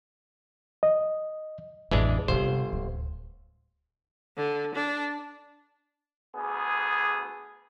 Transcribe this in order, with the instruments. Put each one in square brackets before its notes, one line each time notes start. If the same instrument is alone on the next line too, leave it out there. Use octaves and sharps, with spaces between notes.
[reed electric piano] D#5
[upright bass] A1 F2 [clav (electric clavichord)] E3 G#3 D4
[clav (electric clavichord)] G1 C5 [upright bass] C3 F4
[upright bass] D1
[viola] D3
D4
[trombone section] D2 B3 G#4